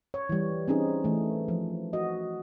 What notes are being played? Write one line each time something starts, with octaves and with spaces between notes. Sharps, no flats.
C#5
E3 G3
C4 C#4 D#4 G#4
E3 A3
F3
F#4 D#5